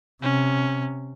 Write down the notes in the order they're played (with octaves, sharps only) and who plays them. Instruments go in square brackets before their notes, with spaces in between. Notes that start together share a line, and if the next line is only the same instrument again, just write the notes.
[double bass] C3 [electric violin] C#4